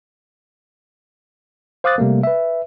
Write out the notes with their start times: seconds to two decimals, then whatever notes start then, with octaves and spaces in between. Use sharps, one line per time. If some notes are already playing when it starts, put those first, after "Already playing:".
1.84 C5 F5 D6 D#6 F#6 A6
1.98 C3 G3 A3 A#3
2.23 B4 E5